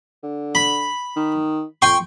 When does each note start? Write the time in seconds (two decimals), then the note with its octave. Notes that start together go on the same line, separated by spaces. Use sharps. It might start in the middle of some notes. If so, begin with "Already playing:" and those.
0.23 D3
0.55 B5
1.16 D#3
1.82 F2 G5 C6 C#6